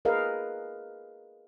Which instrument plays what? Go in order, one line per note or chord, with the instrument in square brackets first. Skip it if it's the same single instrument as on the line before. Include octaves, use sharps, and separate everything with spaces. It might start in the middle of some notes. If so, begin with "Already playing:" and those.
[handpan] G#4 A#4 B4 D#5 F5